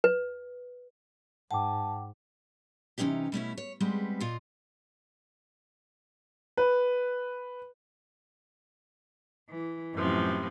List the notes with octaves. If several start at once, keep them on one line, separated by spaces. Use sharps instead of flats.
B4
G#2 F#5 G5 A5 D6
C3 E3 A#3 C#4 D#4 G4
B2 A3 C#4 E4
C#5
G3 G#3 B3 C4
A#2 F4 D#5
B4
E3
F#2 A2 C3 E3 F3